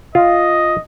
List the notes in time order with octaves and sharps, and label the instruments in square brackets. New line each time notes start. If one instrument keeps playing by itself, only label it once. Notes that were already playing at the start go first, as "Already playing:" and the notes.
[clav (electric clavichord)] F4 [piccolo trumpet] D#5